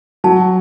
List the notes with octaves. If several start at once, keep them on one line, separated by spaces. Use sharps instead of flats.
F#3 A5